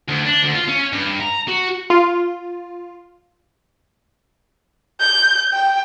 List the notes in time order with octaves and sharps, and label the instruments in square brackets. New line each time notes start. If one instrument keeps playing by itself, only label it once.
[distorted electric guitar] D2
D4
D2
F4
C#4
G2
A#5
F#4
[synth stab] F4
[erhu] G6
G5